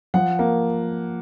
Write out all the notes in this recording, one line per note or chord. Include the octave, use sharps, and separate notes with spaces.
F3 F#5
A#3